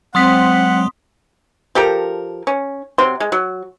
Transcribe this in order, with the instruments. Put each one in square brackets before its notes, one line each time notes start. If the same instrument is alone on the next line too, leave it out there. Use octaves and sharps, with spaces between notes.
[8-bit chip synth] F#3 G#3 [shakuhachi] C4 [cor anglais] F#5 [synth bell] C6 D#6 B6
[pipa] F3 G4 A4 A#4
C#4
C3 F#3 C4 C6
G#3
F#3